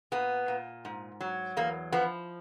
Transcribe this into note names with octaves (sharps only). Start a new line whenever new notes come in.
A#2 B3
A#2
G#2
F#3
E2 A#3
F3 B3